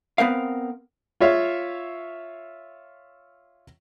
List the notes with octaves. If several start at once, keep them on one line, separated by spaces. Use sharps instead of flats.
B3 C4 A#4 F5
F4 C#5 E5 F5